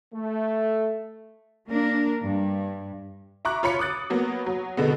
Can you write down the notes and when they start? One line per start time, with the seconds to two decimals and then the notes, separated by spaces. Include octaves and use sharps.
0.14 A3
1.69 A#3 D4 A#4
2.25 G2
3.45 E5 A#5 C#6 D6 F#6
3.63 F4 C#5 B5 C#7
3.79 D6 D#6 F#6 A6
4.10 F#3 A#3 B3
4.46 F#3
4.77 B2 D3 G#3 B3